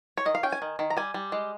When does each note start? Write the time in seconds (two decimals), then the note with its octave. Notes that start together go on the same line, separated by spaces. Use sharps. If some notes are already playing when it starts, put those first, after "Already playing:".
0.17 C#5
0.25 D#3 D#5
0.35 F5
0.43 C#4 G5
0.52 G#5
0.62 D#3
0.79 D#3
0.90 A#5
0.97 G3 G#5
1.14 G3
1.32 G#3